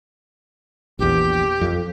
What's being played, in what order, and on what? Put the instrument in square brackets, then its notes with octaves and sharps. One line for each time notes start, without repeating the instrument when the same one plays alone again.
[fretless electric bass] A#1 E2 [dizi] G4
[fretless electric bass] F2